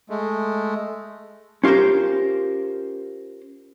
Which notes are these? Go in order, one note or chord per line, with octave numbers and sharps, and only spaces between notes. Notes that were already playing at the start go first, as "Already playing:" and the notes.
G#3 A3
C#4 F4 G4 A#4 C5